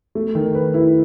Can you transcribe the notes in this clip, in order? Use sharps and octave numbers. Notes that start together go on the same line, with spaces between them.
A3
D#3
B4
E4